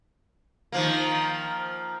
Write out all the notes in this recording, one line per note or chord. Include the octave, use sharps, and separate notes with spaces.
D#3 F3 A#3